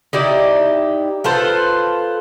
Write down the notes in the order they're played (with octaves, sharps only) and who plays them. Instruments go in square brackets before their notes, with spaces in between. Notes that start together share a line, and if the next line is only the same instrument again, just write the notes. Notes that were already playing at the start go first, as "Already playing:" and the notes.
[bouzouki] D#4 E4 G4 D5
F4 A4 B4 C5